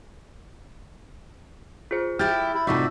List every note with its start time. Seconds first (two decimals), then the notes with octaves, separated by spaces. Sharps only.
1.91 F4 G#4 C5
2.19 E4 G4 F6 G6 A6
2.54 E4
2.67 A2 C3 D#4 F4 F#4 D5 E5